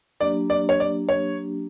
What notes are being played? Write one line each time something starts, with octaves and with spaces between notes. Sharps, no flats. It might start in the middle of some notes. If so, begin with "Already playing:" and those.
F#3 A#3 D4 G4 D5
D5
C#5
D5
C#5